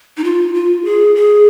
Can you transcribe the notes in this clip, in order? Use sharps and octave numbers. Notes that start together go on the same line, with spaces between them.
D#4
F4
F4
G#4
G#4